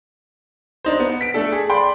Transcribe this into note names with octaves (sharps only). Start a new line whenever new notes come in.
D4 D#4 C5
B3
B6 D7
A3 D4 A4
G#4
D5 G5 B5 C6